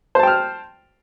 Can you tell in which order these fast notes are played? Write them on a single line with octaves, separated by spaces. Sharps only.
C5 A5 G5 F6